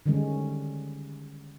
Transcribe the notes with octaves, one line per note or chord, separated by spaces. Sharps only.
D3 D#3 G3 G#3 C#4